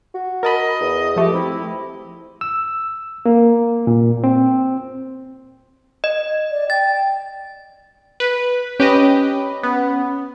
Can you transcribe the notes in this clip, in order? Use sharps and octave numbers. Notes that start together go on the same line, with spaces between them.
F#4
A#4 D#5 A5 B5
E2
F3 A3 G4
C4 E4
E6
A#3
A#2
C4
D#5
D5
G5 A6
B4
C#4 G4 B4 D#5
B3